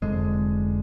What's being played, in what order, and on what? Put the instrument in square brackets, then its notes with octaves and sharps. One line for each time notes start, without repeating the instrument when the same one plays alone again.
[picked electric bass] F1 F2 D3 G#3